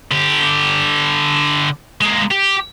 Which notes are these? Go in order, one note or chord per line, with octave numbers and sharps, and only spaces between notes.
D3 G4
G#3 A#3
G4